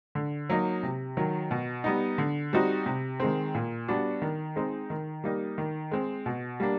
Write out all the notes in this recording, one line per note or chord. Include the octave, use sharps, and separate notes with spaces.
D3
F#3 A#3 D#4
C3
D#3 F#3
B2
G3 B3 D#4
D3
G3 C4 D#4 F#4
C3
D#3 G#3 C4
A#2
G3 B3 D4 F#4
D#3
G#3 C4 D#4
D#3
G3 A#3 D#4
D#3
G#3 C4
B2
G3 A#3 D4